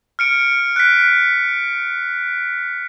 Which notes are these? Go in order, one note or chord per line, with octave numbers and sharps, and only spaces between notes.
F6 C#7 D7
F#6 B6